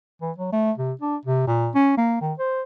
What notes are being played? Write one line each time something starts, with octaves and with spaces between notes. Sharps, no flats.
E3
F#3
A3
C3
D4
C3
A#2
C#4
A#3
D#3
C5